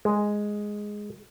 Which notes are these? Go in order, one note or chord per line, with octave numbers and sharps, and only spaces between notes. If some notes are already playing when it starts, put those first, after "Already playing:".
G#3